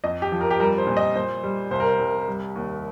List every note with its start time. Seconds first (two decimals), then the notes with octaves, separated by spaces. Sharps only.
0.04 F2 D#5
0.22 G4
0.32 F3
0.41 A#4
0.51 G4
0.60 G3 A#4
0.78 C5
0.87 A#2
0.97 D#5
1.15 A#2 C5
1.44 G3
1.71 C2 C5
1.80 A#4
1.88 C5
1.99 C2
2.27 G3
2.55 D#2